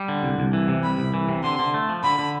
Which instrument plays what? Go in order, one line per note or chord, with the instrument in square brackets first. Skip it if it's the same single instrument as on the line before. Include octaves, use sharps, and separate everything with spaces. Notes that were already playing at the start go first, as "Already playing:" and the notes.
Already playing: [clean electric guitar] G3
D3
C2
C2
E3
C3
[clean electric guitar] C2 [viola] B5
[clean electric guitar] C2
E3
C3
[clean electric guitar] D3 [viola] C6
[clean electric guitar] D3
A3
F3
[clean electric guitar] D3 [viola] B5
[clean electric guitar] D3